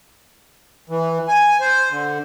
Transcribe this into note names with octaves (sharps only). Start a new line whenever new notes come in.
E3
G#5
C5
D3